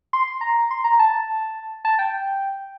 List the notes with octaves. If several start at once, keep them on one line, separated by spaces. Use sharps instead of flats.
C6
C6
A#5
C6
A#5
A5
A5
G5